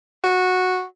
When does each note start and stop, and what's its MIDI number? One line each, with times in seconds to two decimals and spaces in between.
0.24 0.84 66